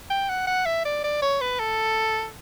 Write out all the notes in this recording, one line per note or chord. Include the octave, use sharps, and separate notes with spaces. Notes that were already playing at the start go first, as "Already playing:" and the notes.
G5
F#5
F#5
E5
D5
D5
C#5
B4
A4